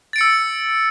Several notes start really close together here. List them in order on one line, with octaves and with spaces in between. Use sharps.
A6 D7 C#7 E6